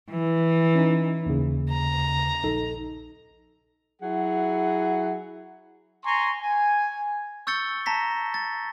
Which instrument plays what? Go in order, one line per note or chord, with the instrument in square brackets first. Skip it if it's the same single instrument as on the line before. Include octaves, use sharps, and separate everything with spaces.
[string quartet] E3
[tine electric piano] C#4 D#4
D#2 C#3
[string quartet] A#5
[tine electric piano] A#1 D#4 A4
[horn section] F#3 E4 G#4 F#5
[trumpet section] G#5 A#5 C6 C#6
G#5
[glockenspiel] C#6 E6 G6 A6 C#7 G7
A5 A#5 A#6 B6
A6